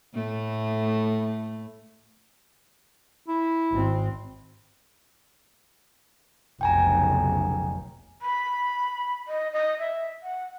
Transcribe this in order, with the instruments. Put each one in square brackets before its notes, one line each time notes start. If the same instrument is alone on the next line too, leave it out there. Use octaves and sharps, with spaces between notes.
[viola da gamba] A2 A3
[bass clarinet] E4
[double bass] G#1 C4
[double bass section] F1 B1 C#3 [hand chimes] G5 G#5 A#5
[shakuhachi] B5
D#5
D#5
E5
F#5